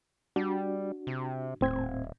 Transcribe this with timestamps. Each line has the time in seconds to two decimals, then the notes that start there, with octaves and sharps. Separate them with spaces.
0.36 G3 D4 F#4
1.07 C3
1.61 D#1 A2 C4 G#6